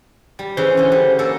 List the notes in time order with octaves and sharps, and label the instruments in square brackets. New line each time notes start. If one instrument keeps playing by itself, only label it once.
[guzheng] G3
[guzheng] C#3 E3 [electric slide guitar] C5
[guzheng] D3 C#4
G3
A#3 A4 E5